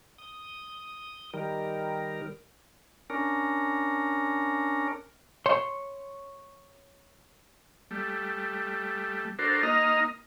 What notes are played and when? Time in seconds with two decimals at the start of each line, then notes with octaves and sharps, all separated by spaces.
0.18 D#6
1.34 D#3 G3 A#4
3.10 C#4 D4 A#4
5.46 C#5 C6
7.91 G3 A3
9.39 D4 F#4 A4 A#4 C5
9.63 A#3 D#4 D#5 A#5 F6